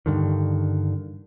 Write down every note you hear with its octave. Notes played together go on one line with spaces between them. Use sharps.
G2 D3 D#3